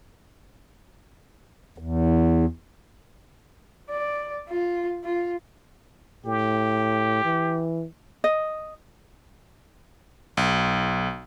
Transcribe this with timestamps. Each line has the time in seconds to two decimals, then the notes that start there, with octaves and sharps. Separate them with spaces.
1.78 E2
3.90 D5
4.49 F4
5.04 F4
6.26 A2 G4
7.25 E3
8.24 D#5
10.37 B1